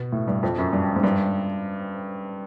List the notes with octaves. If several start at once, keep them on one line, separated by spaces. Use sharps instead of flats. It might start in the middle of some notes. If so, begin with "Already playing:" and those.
Already playing: B2
A2
G2
F2
F#2
G2
G#2
G2